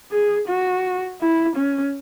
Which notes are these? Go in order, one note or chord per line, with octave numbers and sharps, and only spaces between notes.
G#4
F#4
E4
C#4